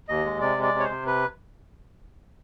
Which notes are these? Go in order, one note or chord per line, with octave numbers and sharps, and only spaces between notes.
D#2 D#5
G#3
C3 D5
G#3
D5
C3
C#5
C5
C3
B4